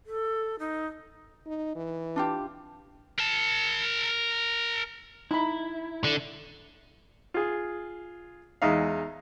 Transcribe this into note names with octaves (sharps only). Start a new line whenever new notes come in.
A4
D#4
D#4
E3
D4 F4 G4
A#4 A5
D#4 E4 B5
D3
F4 G#4
E2 G#3 D#4 E5 F5